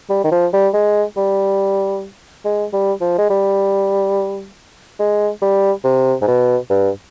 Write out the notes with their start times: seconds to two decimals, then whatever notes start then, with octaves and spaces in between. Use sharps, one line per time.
0.10 G3
0.24 D#3
0.32 F3
0.53 G3
0.74 G#3
1.17 G3
2.45 G#3
2.73 G3
3.01 F3
3.18 G#3
3.30 G3
5.00 G#3
5.42 G3
5.85 C3
6.21 G#2
6.28 B2
6.70 G2